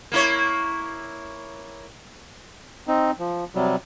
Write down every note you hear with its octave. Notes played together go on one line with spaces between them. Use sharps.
A#3 E4 C#5
C4 D#4
F3
C3 F#3 G3